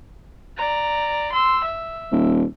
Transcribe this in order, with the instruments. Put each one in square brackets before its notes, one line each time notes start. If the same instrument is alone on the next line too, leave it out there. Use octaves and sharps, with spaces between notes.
[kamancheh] D5 A#5
C6 E6
E5
[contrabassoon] D#1